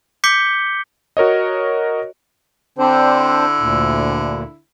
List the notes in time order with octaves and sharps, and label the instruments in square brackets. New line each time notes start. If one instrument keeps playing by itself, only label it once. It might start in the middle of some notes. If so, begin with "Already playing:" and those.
[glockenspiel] D6 G6 B6 C#7 G7
[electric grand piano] F#4 A#4 C#5 D#5
[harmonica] D3 E4 [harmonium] C4 D4 C5
[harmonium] D2 A#2